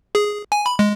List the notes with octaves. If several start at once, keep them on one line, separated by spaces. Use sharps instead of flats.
G#4
G#5
B5
G#3